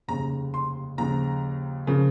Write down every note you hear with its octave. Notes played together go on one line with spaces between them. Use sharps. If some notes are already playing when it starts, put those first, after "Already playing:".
F1 D#2 C#3 A#5
C6
D#2 C#3 F3 A#5
C#3 F3 A#3